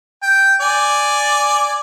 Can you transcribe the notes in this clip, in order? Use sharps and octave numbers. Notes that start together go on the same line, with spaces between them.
G5
D5 G#5